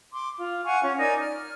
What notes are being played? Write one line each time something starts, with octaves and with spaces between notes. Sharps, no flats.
C6 D6
F4
F5 F#5 G#5 C#6
C#4 F4
D#4 A#4 D5 G#5
F6